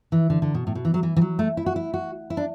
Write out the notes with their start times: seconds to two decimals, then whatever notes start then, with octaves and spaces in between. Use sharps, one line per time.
0.12 E3
0.30 D3
0.42 D3
0.54 B2
0.67 A2
0.75 B2
0.85 E3
0.94 F#3
1.03 E3
1.16 E3
1.21 F#3
1.39 A3
1.57 E4
1.66 F#4
1.76 E4
1.94 F#4
2.30 E4
2.37 D4